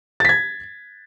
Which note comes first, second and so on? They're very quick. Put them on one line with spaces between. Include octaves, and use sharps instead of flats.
A6 B6 G#6